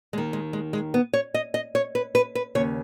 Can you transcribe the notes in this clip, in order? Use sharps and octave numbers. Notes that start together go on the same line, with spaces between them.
D#2 D#3 G#3
G#3
G#3
G#3
B3
C#5
D#5
D#5
C#5
B4
B4
B4
D#2 C#3 C#5